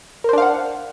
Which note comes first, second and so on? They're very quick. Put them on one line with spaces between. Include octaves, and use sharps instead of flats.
A#4 C5 D4 F5 F#5